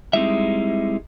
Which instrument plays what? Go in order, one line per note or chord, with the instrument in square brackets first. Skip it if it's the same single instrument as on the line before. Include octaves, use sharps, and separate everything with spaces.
[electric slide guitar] G3 G#3 D#4 [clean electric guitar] C4 E4 E5